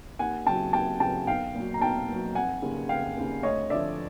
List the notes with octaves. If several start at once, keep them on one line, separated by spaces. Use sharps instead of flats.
D#2 F#5 G#5
C#3 F#3 G5 A5
D#2 G5 A5
C#3 F#3 G5 A5
B1 F5 G5
A#2 F#3
A#5
B1 G5 A5
A#2 F#3
F1 F#5 G#5
D#2 C#3
F1 F5 G5
D#2 C#3
D2 C#5 D#5
D3 F3 D5 E5